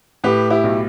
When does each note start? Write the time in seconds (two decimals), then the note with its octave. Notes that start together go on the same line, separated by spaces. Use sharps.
0.24 A2 G4 B4
0.50 E4 G4
0.64 B1